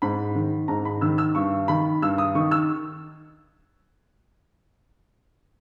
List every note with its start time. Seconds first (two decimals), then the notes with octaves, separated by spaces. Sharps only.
0.02 G#2 B5
0.35 D#3
0.68 G#2 A#5
0.85 B5
1.01 D#3 E6
1.18 E6
1.35 G2 C#6
1.68 D#3 B5
2.02 G2 E6
2.18 D#6
2.35 D#3 C#6
2.51 E6